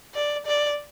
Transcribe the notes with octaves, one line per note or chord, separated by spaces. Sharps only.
D5
D5